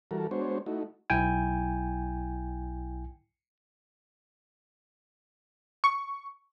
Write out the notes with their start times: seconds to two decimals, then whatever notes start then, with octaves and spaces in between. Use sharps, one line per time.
0.11 E3 G3 F#4 A4 A#4
0.31 G#3 B3 D4 F#4 C5 C#5
0.66 A3 D#4 E4 F#4
1.10 B1 E4 G5 G#5
5.84 C#6